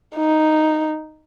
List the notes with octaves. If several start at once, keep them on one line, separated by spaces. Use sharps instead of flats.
D#4